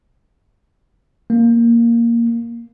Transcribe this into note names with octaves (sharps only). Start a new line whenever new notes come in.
A#3